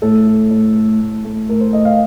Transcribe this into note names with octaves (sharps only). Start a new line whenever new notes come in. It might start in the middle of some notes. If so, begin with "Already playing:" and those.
A2 A4
A3
A2
A3
A2
A3
A2 A#4
C5
A3 D#5
F5